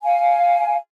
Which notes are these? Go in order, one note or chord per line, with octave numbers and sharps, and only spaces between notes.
F5 G#5